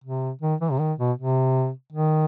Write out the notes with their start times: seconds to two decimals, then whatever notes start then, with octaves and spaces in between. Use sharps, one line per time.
0.04 C3
0.42 D#3
0.61 E3
0.71 C3
0.80 D#3
0.99 B2
1.17 C3
1.93 D#3